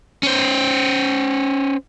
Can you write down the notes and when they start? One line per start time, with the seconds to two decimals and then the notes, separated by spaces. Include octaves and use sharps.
0.23 C#4 C5